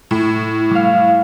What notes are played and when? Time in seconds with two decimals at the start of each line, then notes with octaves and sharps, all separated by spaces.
0.11 A2
0.71 G3 F5